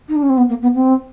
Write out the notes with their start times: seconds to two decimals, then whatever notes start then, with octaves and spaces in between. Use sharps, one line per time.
0.09 D#4
0.16 D4
0.23 C#4
0.29 C4
0.37 B3
0.49 A#3
0.62 B3
0.74 C4